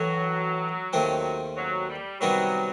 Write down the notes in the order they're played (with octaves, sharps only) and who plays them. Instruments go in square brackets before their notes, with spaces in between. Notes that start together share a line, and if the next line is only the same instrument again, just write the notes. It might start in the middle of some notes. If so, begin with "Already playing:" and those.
Already playing: [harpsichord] A2 E3 A3 [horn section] F#3
[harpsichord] D#2 D#3 A3 C4
[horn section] F#3
G3
[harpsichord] C3 D#3 G3 B3 D#4 [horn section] F#3